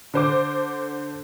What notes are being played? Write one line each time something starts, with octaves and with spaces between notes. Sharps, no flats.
D3 C5 D6